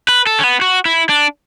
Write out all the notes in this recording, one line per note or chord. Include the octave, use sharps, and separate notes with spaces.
B4
A4
C#4
B3
F#4
E4
D4